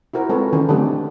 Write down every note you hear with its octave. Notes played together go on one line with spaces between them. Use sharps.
E4 F#4 A#4 C5
G#3 C4 F4 A4 B4 C#5
D#3 E3 C#4
D3 F#3 A3 C4 G4 G#4